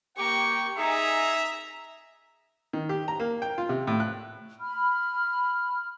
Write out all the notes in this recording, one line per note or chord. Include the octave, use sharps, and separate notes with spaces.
A#3 G4 G5 C#6
D#4 G#4 E5 A#5
D#3
G4
A#5
A#3
G5
F4
C3
A2
F#6
B5 F6